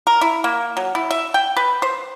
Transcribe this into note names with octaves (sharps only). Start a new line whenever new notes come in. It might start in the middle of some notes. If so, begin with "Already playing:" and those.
A#4
E4
A#3
F#3
E4
E5
G5
B4
C5